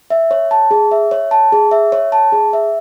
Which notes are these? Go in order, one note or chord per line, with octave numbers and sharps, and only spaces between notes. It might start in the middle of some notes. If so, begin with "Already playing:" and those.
E5
C#5
A5
G#4
E5
C#5
A5
G#4
E5
C#5
A5
G#4
E5